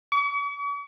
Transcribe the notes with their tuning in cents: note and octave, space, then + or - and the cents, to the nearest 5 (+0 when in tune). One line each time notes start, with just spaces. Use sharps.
C#6 +45